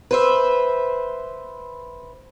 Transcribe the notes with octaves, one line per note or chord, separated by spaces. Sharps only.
B4 C5 E5